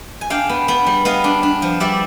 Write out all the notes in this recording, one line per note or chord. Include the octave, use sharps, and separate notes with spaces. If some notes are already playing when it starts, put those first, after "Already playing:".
G#5
D4 F5 G5
B3
B3
G3
B3 D#5 F5
D4
D4
F3
G3 D5 E5